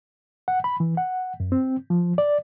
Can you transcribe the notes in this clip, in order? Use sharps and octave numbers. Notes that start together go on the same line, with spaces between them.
F#5
B5
E3
F#5
F#2
C4
F3
D5